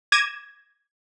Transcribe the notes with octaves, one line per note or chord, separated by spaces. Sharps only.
D6 G#6 A#6 D#7 E7